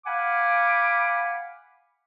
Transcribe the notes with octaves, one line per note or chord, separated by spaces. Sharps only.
F5 F#5 G#5 B5 D6